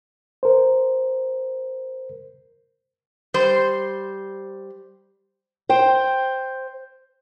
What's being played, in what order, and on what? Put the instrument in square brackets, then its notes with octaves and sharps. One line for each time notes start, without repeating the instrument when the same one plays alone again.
[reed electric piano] A#4 C5
[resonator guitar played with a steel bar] G3 C5
[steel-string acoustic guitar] C5 G5